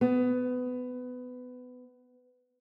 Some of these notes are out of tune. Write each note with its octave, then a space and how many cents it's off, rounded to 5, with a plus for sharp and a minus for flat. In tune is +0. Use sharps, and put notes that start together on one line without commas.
B3 +20